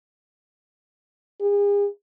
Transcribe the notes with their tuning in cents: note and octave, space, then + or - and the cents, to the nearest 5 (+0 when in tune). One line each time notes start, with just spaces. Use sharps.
G#4 -40